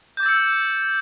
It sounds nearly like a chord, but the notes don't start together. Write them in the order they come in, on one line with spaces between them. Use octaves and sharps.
G6 D6 A6 E6 C#7